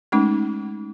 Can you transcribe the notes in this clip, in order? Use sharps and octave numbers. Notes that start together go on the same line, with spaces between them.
G#3 A3 C#4 D#4